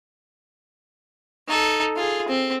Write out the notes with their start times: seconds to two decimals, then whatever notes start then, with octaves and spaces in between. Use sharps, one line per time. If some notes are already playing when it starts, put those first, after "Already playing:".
1.48 D#4 A4
1.96 F4 G#4
2.28 C4